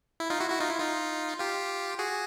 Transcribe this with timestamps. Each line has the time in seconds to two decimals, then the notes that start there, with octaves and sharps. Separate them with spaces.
0.20 E4
0.30 D#4 F4
0.40 E4 F#4
0.50 E4 F#4
0.60 D#4 F4
0.69 E4
0.80 D#4 F4
1.39 F4 G4
1.99 F#4 G#4